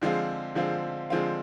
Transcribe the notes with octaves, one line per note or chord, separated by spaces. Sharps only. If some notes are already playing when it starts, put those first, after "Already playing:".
D3 F3 G#3 C4 F4
D3 F3 G#3 C4 F4
D3 F3 G#3 C4 F4